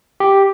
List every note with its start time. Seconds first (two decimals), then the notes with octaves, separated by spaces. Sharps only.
0.20 G4